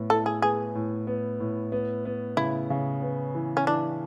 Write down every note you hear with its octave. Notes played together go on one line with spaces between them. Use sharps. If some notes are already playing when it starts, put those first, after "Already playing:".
Already playing: A2 B3
E4 A4
G#4
B3 G#4
A2
B3
A2
B3
B3
C#3 E4
C#3
B3
E3
C#4
E3 D4